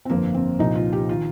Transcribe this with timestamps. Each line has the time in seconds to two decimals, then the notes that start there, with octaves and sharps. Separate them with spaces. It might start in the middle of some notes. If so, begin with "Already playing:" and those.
0.05 C4
0.10 G1 F2 F3 A#3
0.34 C4
0.59 C2 A#2 F3 D#4
0.75 F4
0.93 G4
1.09 D#3 F4